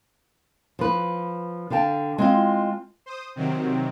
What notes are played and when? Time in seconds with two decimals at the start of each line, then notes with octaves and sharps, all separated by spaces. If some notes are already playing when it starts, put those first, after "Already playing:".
0.79 F3 B4
1.70 D3 F5 G5 A5
2.18 G#3 C4 F4
3.06 C5 D#6
3.36 C3 D#3 F#3 C4